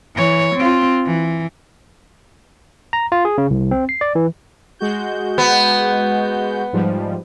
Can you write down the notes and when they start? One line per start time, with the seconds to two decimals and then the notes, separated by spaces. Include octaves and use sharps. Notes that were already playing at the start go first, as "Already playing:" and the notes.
0.15 E3 C#5
0.55 C4 F4
1.06 E3
2.93 A#5
3.12 F4
3.25 G#4
3.38 C#3
3.50 C2
3.71 C4
3.89 C7
4.01 D5
4.15 E3
4.79 G#3 F#4 G6
5.38 B3
6.73 G#2 F3 G3